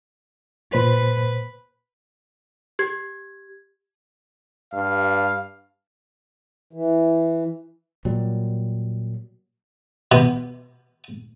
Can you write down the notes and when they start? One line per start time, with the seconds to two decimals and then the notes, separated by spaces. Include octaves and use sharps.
0.73 A#2 B4 C5
2.79 G4 G#6
4.74 G2 F5
6.73 E3
8.05 A#2 F#3 G3
10.12 B2